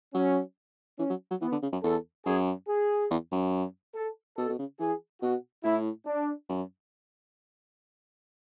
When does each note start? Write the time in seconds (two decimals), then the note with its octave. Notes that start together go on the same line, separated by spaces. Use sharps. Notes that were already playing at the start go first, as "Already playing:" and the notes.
0.14 F#3 C#4
0.99 E3 C#4
1.10 F#3
1.30 F#3
1.41 E3 B3
1.52 D3
1.62 C#3
1.73 F#2
1.83 E2 A4
2.26 F#2 G#4
2.68 G#4
3.10 E2
3.32 F#2
3.95 A4
4.37 B2 A4
4.49 B2
4.59 C#3
4.80 E3 G#4
5.22 B2 F#4
5.64 A2 E4
6.06 D4
6.49 F#2